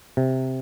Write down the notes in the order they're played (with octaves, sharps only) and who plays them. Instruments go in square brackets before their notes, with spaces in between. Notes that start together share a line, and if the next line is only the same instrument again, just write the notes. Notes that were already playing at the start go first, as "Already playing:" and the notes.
[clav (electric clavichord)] C3